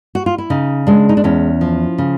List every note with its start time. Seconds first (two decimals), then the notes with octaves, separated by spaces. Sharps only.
0.15 F#4
0.26 F4
0.38 E4
0.50 C#3 D#4
0.87 G#3 D4
1.09 D#4
1.17 D4
1.24 E2 C#4
1.61 F3
1.98 C#3